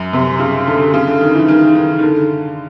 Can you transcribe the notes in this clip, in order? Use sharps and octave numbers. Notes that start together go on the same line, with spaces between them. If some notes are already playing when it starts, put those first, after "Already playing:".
Already playing: F#2
C3
C#3
D3
C#3
D3
D#3
E3
D#3
D#3
D#3
D3